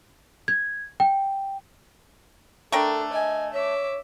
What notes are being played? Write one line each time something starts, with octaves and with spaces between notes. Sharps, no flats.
G#6
G5
A3 D4 A4 A#4 G5
D#5 G#5
C#5 E5 D6